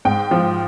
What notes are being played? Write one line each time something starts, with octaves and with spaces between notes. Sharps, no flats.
G#2 G5
F3